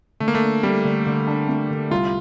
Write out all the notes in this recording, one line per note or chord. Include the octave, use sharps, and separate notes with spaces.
D3 A3
A#3
A3
D4
G3 A3
D3
D3
D4
A3
D3
C2 F4